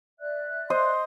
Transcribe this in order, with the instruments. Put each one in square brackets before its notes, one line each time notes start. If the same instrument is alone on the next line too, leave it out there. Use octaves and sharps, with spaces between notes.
[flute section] D5 E5 F#6
[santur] C5 D#5 [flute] C6